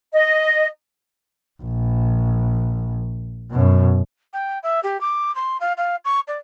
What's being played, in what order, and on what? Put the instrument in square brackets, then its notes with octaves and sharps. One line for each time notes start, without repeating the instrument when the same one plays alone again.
[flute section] D#5
[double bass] A#1
F#2 B2
[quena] G5
E5
G4
D6
C6
F5
F5
C#6
D5